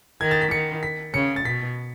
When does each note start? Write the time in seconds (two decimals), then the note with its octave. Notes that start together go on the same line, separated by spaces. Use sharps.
0.21 D#3 G#6
0.31 A6
0.41 B6
0.51 D#3 C#7
0.83 B6
1.13 C#3 C#7
1.36 A6
1.44 B2 B6